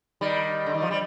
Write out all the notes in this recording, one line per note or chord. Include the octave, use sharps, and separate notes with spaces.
D#3 G3
D3
D#3
F3
G3